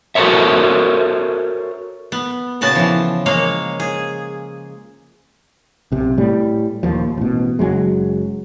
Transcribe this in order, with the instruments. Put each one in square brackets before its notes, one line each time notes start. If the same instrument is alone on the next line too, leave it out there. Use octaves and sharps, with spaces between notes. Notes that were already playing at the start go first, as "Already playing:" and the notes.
[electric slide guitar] F#4 A4 A#4 C5 C#5 E5
[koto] B3
A#2 C#3 B3 F#4 A5
E3 F3
G#3 A#3 C#5 F5
G#4
[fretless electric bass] B1 C3
A2 G3
D#1 D#2 F3
A1 B2
F#1 C2 F#3 G#3